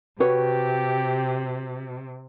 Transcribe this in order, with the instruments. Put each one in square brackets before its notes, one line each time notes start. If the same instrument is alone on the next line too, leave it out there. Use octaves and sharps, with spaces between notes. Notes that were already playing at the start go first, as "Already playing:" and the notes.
[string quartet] C3 [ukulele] F#4 B4 C#5 [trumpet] G4